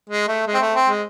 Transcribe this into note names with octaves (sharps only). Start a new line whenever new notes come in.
G#3
A3
G#3
C4
A3
C4
G#3